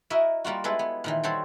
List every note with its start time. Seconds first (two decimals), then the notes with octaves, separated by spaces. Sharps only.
0.10 E4 F#4 A#4 D#5 E5
0.44 G3 A#3 F4 F#4
0.64 G#3 B3 E4 A4 B4
0.79 B3
1.04 A#2 D#3 E3
1.24 G3 F#4 A4 C5 C#5